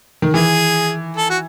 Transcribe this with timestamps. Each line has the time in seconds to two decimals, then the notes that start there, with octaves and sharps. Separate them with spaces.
0.22 D#3
0.34 E3 G#4
1.17 A4
1.30 F#4